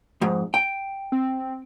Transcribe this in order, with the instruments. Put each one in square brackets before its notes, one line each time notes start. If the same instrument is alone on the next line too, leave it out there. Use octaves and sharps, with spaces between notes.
[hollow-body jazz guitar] F2 G#2
G5
[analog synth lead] C4